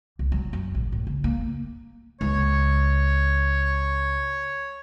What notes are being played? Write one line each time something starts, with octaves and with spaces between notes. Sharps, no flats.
C2
F#3
F#2
A#1
A2
C#3
A#3
C#2 C#5